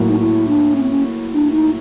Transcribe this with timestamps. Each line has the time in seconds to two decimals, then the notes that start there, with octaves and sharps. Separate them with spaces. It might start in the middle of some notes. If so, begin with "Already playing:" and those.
Already playing: A2 F#3 A#3
0.09 D#4
0.19 E4
0.48 D4
0.76 C#4
0.83 C4
0.90 C#4
1.34 D4
1.52 D#4